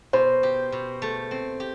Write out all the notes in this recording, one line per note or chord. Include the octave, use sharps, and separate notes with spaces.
B2 C5
G4
B2
A3
C4
G4